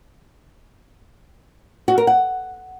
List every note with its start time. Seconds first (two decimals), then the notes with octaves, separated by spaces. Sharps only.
1.88 F#4
1.98 A#4
2.07 F#5